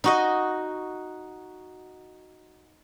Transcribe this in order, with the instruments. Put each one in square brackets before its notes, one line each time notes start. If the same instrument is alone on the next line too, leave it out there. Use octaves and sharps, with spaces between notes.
[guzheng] D#4 F#4 D#5